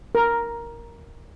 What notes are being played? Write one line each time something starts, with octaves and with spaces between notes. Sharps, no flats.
A#4